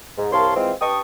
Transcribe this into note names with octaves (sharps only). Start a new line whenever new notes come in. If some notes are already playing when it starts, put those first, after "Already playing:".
G#2
C2 A#4 C#5 F5 A5 C6
E3 G#3 C4 F4
G2 B4 G5 A5 C#6 D#6